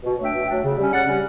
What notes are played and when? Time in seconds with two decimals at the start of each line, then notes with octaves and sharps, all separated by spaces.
0.04 B2
0.18 F#3 A3 D4 E5 G5
0.33 B2
0.48 F#3 A3 D4
0.63 C#3
0.78 G3 C#4
0.92 C#3 D5 F#5
1.07 G3 C#4